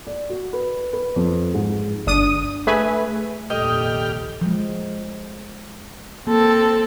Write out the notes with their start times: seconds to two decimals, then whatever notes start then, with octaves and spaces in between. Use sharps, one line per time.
0.07 D5
0.30 F#4
0.53 B4
0.93 B4
1.16 F2
1.54 G#2
2.06 G1 D4 D#6 D#7
2.67 A3 G#4 B4 E5 G#5
3.50 F1 A#1 D#2 G3 A4 D#5 G5 F6
4.41 F3 G#3
6.27 A#3 C4 A4